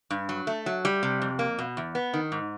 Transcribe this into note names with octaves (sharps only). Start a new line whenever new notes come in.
G2
F#3
A3
F#3
G3
C3
F2
A#3
B2
E2
B3
D#3
G#2